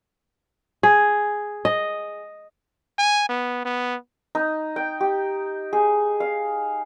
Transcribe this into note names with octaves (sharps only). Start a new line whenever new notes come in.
G#4
D#5
G#5
B3
B3
D#4
G5
G4
G#4
F5